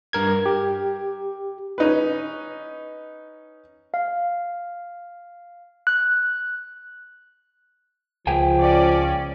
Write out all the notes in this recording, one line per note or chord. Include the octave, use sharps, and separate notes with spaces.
G2 A#4 G#6
G4
C#4 D#4 B4
F5
F#6
C#2 F3 G#4 G5 G#5
C#4 D5